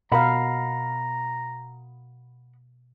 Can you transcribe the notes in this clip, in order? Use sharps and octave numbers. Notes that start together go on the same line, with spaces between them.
B2 A#4 D#5 F5 F#5 A#5 B5